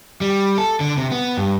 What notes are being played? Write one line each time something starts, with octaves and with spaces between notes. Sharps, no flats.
G3
A4
D3
C3
B3
G2